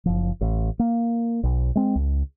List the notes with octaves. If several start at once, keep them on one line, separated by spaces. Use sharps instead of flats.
F#1 F3
A1
A#3
B1
G#3 C4
C#2